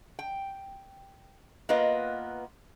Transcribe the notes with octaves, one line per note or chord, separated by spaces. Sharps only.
G5
A#3 B3 F4 B4 D#5